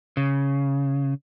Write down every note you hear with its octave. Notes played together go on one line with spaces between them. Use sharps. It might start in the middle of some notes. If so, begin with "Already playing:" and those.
C#3